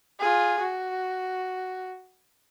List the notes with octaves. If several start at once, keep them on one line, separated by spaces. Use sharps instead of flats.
F4 G#4
F#4